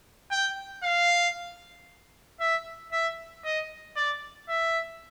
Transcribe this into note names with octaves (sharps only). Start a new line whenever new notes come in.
G5
F5
E5
E5
D#5
D5
E5